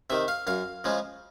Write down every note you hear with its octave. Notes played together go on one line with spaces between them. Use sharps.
C3 D#3 E5
F5
F#2 F5
C#3 F3 G#3